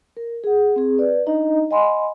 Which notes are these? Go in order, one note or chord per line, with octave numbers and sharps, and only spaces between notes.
A#4
G#4 F#5
C4 G#4
B4 D5
D4 D#4 D#5 A#5
D#5 F#5 G#5 B5 C6